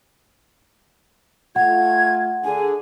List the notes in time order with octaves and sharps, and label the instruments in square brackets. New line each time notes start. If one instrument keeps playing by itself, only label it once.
[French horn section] A3 F4 [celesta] F#5 [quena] G#6
[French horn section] D3 G#4 [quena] G#5